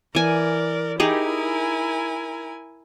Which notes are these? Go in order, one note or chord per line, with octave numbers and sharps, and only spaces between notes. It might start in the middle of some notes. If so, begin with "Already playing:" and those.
E3 A#4 D5 G#5
D#4 E4 G4 G#4 A#4 G#5